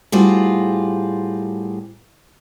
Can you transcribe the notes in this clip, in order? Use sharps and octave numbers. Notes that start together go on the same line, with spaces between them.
A2 G3 C4 F4 F#4 G#4